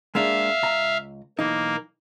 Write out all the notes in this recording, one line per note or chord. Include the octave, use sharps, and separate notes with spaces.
G#3 A#3 D4 E5 F5
C#2 A#5
B1 E3 A#3 D#4